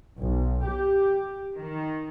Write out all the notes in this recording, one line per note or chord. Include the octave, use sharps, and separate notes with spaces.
B1
G4
D#3